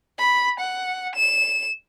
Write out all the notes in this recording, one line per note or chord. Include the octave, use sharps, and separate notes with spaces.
B5
F#5
E7